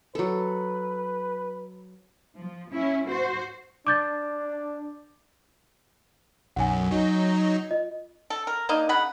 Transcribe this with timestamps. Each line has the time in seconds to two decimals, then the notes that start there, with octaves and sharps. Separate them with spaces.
0.15 F#3 A4 B4
2.39 F3
2.71 C#4 E4
3.08 F#4 C5
3.87 D4 D6 G6 A6
6.56 B1 F#2 F#5 G#5
6.91 F#3 D#4
7.71 F4 D#5
8.30 A4
8.47 A#4
8.69 A#3 D4 D#4
8.89 C#3 F#5 B5